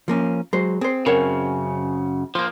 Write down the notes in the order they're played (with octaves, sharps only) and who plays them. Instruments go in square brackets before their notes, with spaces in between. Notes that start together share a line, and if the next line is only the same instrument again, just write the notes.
[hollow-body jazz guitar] F3 A#3 C#4
[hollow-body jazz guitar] F#3 G#3 [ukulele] C5
[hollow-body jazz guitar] C4 [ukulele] G#4 C5
[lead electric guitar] F#2 C#3 [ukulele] F#4 A#4 C#5
[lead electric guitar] F3 A#3 [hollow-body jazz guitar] C5